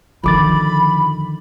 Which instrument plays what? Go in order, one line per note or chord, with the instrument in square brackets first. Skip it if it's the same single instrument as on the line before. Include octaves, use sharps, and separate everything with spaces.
[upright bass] D3 D#3 [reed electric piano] F3 D6 A6 [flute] B5